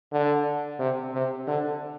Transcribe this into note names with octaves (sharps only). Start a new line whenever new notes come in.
D3
C3
C3
D3